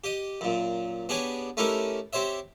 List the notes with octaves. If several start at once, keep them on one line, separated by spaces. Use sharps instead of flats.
G4 D#5
F#2 A#2
B3 D4 G4 G#4 C#5
A3 C#4 D#4 E4 G4 A#4
C4 G4 C5 C#5 E5